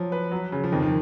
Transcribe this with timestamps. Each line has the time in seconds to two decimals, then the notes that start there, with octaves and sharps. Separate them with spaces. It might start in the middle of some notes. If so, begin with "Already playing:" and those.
Already playing: F3 F#3
0.12 B4
0.32 F#3
0.52 C#3
0.64 F3
0.72 F2 D#3
0.83 D#3